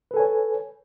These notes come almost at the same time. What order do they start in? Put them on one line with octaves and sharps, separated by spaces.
B4 A4 G#5 C#5